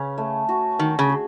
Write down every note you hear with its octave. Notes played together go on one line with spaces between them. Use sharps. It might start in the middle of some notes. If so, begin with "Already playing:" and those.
Already playing: C#3 C#4 B4
A3
F#4
D#3 E5
C#3
G#4